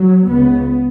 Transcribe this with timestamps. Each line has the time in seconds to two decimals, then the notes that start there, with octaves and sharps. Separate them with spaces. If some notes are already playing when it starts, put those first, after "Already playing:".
Already playing: F#3
0.29 C#2 C#3 B3